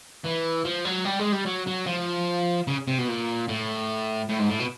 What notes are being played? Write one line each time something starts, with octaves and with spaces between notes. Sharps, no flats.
E3
F3
F#3
G3
G#3
G3
F#3
F#3
F3
C#3
C3
B2
A#2
A2
A2
G#2
A2
B2